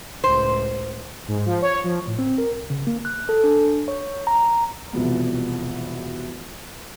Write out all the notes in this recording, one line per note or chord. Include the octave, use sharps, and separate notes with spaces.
C#2 A2 C5
G#2
F3
C#5
F3
A2
C4
A#4
C2
C#3
A#3
F#6
A4
D4
C#5
A#5
E1 C2 B2 F3 B3